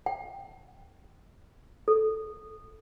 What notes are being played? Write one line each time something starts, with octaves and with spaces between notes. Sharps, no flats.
G5
A4